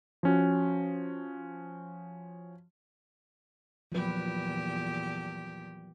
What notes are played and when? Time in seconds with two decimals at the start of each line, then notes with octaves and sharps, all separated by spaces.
0.23 F3 C#4 F#4
3.92 E2 A#2 F3 F#3 G4 B4